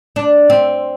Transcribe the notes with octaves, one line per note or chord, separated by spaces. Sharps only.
D4
C4